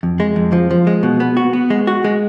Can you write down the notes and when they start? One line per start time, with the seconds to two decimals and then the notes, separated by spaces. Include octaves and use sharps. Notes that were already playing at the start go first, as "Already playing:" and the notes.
0.03 F2
0.20 G#3
0.36 F2
0.53 F3
0.71 F3
0.87 G#3
1.03 B2
1.20 B3
1.37 F#4
1.53 B3
1.70 G#3
1.87 F#4
2.04 G#3